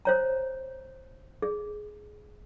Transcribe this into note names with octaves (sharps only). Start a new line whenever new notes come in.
C5 C#5 A#5
G#4